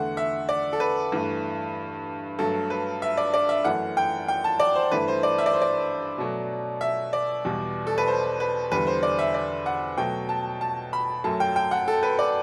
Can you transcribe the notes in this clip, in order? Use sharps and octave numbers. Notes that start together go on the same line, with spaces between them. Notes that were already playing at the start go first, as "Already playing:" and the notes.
Already playing: E2 D3 A3 F#5
E5
D5
A4
B4
G2 E3 A3
G2 F#3 A3 A4
B4
E5
D5
D5
E5
F#2 E3 A3 F#5
G5
G5
A5
D5
C5
G2 E3 A3 B4
C5
D5
E5
D5
C5
D5
B2 F#3 A3
E5
D5
E2 B2 G3
A4
B4
C5
B4
E2 D3 G3 B4
C5
D5
E5
D5
F#5
B2 F#3 A3 G5
A5
A5
B5
F#2 F#3 A3 A5
G5
G5
F#5
A4
B4
D5